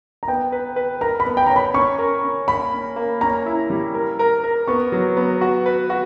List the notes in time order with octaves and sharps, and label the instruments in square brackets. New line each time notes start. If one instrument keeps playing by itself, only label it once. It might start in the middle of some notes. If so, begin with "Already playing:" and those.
[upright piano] A#5
[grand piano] B3 [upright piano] G5
[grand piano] B4
B4
[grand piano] A#4 [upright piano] A#5
[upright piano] B5
[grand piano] B3
[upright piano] G5
[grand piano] C#5 [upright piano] A#5
[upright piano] B5
[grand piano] C#4 [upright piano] C#6
[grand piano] A#4
C#4
[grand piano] A#3 [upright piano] B5
[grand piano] C#4
A#3
[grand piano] C#4 [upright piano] A#5
[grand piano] E4
G3
A#4
A#4
A#4
[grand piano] B3 [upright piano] C#6
[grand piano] F#3
B3
F#4
B4
F#4